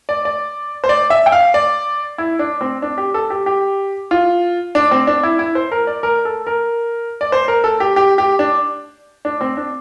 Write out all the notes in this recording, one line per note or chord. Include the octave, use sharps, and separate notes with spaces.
D5
D5
C5
D5
E5
G5
F5
D5
E4
D4
C4
D4
G4
A4
G4
G4
F4
D4
C4
D4
E4
E4
C5
A#4
D5
A#4
A4
A#4
D5
C5
A#4
A4
G4
G4
G4
D4
D4
C4
D4